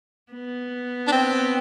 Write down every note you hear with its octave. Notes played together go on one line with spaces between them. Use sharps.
B3
D4
C4